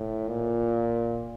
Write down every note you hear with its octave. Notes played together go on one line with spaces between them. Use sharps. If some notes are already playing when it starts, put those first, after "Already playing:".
Already playing: A2
A#2